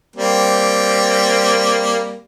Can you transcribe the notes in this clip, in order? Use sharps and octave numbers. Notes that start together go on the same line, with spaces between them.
G3 A#3 C4